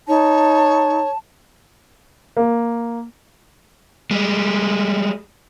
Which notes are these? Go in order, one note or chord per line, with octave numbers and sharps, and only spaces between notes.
D#4 C#5 A5
A#3
G3 G#3